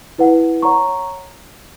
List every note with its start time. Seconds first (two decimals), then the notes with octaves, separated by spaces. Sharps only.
0.18 E4 B4 F#5
0.62 C#5 F#5 A#5 C#6